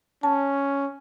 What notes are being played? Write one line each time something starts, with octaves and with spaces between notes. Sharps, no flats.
C#4 A5